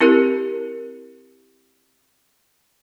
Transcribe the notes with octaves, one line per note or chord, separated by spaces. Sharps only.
C4 E4 G4 A#4